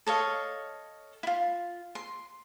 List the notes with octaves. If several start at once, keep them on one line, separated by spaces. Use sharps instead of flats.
A4 C#5 D#5 F5
E4 F4
C6